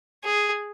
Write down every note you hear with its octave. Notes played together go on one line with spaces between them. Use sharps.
G#4